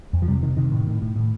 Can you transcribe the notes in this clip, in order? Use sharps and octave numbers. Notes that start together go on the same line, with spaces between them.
F2
F3
C3 G3
C3 D#3
C3 D#3
A2
A2
A2
A2